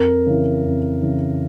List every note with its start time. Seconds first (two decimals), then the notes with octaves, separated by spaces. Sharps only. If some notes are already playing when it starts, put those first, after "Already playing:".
Already playing: F2 A#4
0.26 C#3 E3
0.64 F2
1.02 C#3 E3